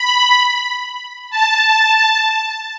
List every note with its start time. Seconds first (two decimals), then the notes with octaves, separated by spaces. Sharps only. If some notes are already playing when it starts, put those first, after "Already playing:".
Already playing: B5
1.30 A5